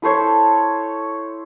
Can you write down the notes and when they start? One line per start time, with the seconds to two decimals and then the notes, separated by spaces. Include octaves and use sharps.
0.02 E4 A4 C5 C#5